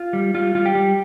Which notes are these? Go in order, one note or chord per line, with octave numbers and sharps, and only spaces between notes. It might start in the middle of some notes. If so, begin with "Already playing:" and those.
Already playing: F4
G3
G3 F4
G3 F4
G4
G3